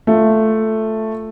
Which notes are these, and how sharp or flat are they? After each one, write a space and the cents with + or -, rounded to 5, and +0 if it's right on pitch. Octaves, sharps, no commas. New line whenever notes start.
A3 +0 F4 +0